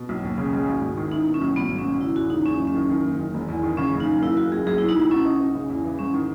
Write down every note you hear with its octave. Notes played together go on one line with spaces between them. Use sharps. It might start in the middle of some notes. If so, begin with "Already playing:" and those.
Already playing: B2
B1
D#2
C#3
G#3
G#1
G#1
D#3
D#4 E4
B2
C#4
B1
G#1 B3
G#2
C#4
G#1
C#3 E4
E2 F#4
C#3 D#4
E2 C#4
F#1
C#4
D#3
D#3
F#1
D#3
E1
E2
D#3
C#3 C#4
F#1
D#4
F#1
A#3 E4
A#3 F#4
C#2 G#4
B1 G#4
E4
B2
D#4
B1 E4
C#4 F#4
D#4
D#4
C#3
E2
E3
G#2 C#4
D#3